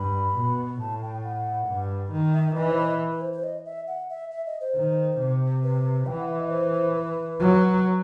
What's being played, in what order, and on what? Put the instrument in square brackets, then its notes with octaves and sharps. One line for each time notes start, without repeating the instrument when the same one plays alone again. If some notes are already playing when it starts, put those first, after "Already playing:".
Already playing: [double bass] G2 [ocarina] B5
[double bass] B2
[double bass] A2 [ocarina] A5
[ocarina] G5
F#5
[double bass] G2
D#3
[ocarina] E5
[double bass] E3 [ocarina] D#5
[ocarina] C5
D#5
B4
C5
C5
D#5
E5
F#5
E5
E5
D#5
C5
[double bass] D#3
C3
[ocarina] B4
[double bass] E3 [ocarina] G5
[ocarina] F#5
E5
D#5
C5
C5
B4
[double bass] F#3